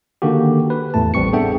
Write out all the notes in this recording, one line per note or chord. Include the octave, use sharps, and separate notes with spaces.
D3 D#3 A#3 F#4 G4
B4
E2 A2 A3 A5
A1 G3 C4 C#6 C#7
B3 D4 G#4 A4 E5 G5